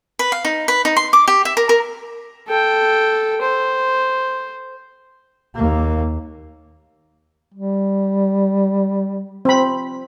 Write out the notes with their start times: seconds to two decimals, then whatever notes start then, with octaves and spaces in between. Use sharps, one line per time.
0.19 B4
0.32 F5
0.45 D#4
0.68 B4
0.85 D#4
0.96 C6
1.13 D6
1.28 G4
1.45 E5
1.57 A#4
1.69 A#4
2.48 A4 G5
3.42 C5
5.55 D#2 A#3
7.54 G3
9.45 C4 B5